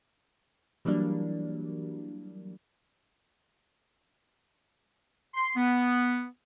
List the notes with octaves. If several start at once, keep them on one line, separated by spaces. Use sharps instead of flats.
E3 F#3 G3 A#3 D4
C6
B3